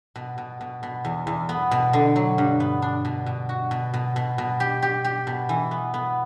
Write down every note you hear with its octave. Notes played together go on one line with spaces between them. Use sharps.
B2
B2
B2
B2
E2
E2
B3
B2
D3
F#3
G2
B3
D4
B2
B2
F#4
B2
B2
B2
B2
G4
G4
G4
B2
E3
B3
B3